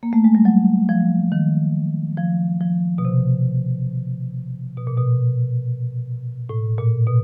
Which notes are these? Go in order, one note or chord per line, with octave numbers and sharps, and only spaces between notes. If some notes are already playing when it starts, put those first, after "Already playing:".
A#3
A3
G#3
G3
F#3
F3
D#3
F3
F3
B2
C3
B2
A#2
B2
A2
A#2
B2